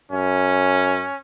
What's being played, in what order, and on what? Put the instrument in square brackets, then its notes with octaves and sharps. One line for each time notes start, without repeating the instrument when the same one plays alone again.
[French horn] F#2 [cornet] C#4